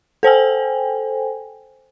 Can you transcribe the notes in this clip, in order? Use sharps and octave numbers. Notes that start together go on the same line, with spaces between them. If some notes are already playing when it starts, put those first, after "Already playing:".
A4 C5 G5 G#5